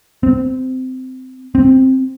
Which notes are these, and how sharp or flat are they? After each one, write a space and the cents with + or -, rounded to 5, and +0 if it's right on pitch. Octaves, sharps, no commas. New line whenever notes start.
C4 -20
C4 +5